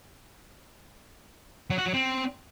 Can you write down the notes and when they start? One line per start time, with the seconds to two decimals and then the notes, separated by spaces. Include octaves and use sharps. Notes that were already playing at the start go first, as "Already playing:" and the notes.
1.70 F#3
1.78 F#4
1.86 F#3
1.94 C4